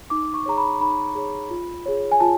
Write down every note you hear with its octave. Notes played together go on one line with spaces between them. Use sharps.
D#4 D6
C#6
G#4 C#5 A#5
B5
D#4 B5
G#4 C#5
F4
G#4 C#5
G#5
F4 A5